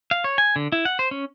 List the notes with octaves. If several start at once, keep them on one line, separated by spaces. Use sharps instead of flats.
F5
C#5
G#5
D3
E4
F#5
C5
C#4